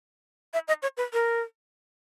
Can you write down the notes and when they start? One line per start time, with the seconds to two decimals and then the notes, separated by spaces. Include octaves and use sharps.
0.54 E5
0.68 D#5
0.82 C#5
0.97 B4
1.13 A#4